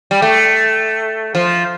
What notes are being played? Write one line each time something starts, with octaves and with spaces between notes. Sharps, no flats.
G3
A3
F3